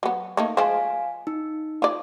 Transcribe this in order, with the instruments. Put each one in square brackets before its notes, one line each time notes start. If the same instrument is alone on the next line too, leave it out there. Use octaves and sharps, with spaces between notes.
[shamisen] F#3 B3
A3 A#3 D#4
[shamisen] F3 G#3 C5 [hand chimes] F5 G#5
[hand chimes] D#4
[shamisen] F4 D5